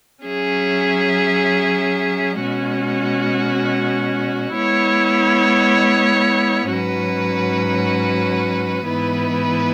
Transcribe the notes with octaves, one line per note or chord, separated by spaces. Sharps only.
F#3 C#4 G#4 E5
B2 G#3 C#4 F#4
G#3 B3 E4 C#5
G#2 F#3 C#4 F#4 B4
G#2 E3 B3 E4 B4